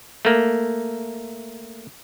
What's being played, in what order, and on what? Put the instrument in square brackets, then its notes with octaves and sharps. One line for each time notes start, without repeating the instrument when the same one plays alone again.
[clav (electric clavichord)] A3 A#3